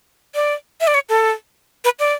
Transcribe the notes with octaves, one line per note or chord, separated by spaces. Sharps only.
D5
E5
D5
C#5
A4
B4
D5